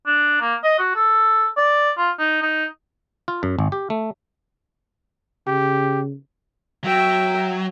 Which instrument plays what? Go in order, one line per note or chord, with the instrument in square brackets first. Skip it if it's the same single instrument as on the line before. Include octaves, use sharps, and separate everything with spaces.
[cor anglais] D4
A#3
D#5
F#4
A4
D5
F4
D#4
D#4
[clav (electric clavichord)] F4
F#2
G#1
G4
A3
[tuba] C#3 [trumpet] G4
[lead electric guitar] F#3 [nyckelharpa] E5 G5